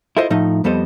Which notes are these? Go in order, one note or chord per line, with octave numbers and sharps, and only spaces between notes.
E4 F4 A4 C5 D#5
A2 F3 A3 D#4
F2 G3 B3 A4 C5 D#5